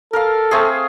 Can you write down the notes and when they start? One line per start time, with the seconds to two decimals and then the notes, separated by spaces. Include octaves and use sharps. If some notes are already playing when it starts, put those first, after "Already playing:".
0.13 A4 A#4 F5
0.51 A3 C4 G#4